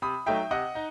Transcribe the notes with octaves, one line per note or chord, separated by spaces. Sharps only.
C3 B5 D#6
F#3 A3 D#4 E5 G5
C3 D#5 F#5
D#4